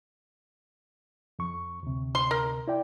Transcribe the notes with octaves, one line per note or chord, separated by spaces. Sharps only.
F2 C#6
D2 C3
C6
A#4
E4 D5 G5